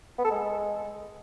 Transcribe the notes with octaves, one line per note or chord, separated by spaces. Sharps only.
B3
A4
G#3